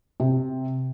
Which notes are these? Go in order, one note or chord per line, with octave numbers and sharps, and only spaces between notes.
C3